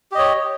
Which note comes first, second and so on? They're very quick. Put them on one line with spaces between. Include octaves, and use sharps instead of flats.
G4 D#5 C#5